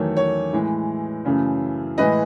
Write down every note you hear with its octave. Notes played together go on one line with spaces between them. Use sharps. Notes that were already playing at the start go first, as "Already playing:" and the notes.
Already playing: E2 D#3 F#3 A3 C#5
C#5
A2 E3 G#3
F#2 C#3 E3 A3
A2 E3 G#3 B4 D#5